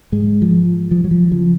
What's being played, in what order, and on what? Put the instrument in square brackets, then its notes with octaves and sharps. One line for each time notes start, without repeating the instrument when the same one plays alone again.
[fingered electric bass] G#2 G#3
F3
F3
F#3
F3
C#3 F3